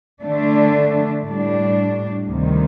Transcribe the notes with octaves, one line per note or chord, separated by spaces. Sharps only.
D3 A3 D4
A2 G3 D4
D2 C3 D#3 G3